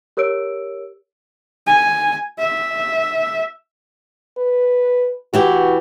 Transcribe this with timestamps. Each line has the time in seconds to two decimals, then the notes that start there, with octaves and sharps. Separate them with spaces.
0.17 G4 A#4 C#5 E6 D7
1.67 G#5
2.38 E5
4.37 B4
5.34 E3 E4 F#4 G4